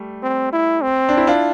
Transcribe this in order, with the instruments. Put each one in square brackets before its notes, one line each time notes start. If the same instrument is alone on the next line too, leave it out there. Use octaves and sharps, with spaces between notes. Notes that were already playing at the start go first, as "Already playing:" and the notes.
Already playing: [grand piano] G3 A3
[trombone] C4
E4
C4
[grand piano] D4
E4
D4 F4